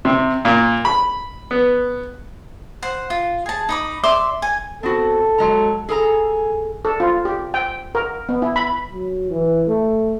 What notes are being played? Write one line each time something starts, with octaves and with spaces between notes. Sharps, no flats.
C3
A#2
B5
B3
C5 F#5
F4
G#4 A5
D#4 B5 D6
D5 E5 C6 D6
G#5
B3 C4 F#4 A4
F#3 G#3 A#5
G#4 A4 G#5 A#5
A4
F4
G4
G5
A#4
B3
E4
B5
F#3
E3
A3